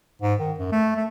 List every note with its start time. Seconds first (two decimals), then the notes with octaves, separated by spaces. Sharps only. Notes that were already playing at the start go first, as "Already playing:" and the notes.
0.22 G#2
0.40 D#3
0.59 F#2
0.72 A3
0.96 A3